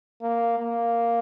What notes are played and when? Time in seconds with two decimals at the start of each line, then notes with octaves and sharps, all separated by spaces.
0.21 A#3
0.58 A#3